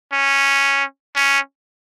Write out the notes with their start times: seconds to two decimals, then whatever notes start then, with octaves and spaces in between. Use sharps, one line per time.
0.13 C#4
1.16 C#4